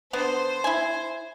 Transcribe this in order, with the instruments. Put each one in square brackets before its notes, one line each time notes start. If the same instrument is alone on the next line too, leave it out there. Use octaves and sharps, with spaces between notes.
[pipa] D3 B3 [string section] C5
[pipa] E4 G#5